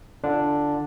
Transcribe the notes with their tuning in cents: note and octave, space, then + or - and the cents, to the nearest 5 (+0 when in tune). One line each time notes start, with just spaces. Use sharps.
D3 +0 D4 +0 F4 -25